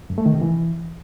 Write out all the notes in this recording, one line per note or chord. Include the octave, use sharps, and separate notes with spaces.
F#2
A3
D#3
C3
E3